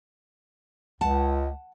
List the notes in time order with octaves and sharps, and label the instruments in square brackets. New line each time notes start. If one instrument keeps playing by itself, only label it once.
[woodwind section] C#2 [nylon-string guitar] F#5 A5